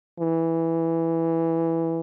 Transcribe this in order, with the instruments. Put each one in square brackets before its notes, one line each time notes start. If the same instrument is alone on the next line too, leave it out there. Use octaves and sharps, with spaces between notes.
[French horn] E3